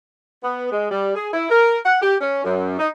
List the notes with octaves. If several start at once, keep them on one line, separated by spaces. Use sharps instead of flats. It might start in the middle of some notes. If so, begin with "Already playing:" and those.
B3
G#3
G3
G#4
E4
A#4
F#5
G4
C#4
F#2
D#4